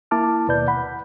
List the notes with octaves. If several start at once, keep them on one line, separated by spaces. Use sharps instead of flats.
A#3 E4 A5 D6 F6
D#2 B2 B4 D5 G6
F#5 B5